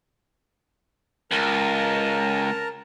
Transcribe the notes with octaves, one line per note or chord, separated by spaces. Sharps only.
C#2 A#4 A5 A#5